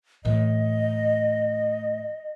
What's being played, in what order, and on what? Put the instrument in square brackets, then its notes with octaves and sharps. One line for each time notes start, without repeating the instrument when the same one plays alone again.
[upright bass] A2 E3 [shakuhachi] D#5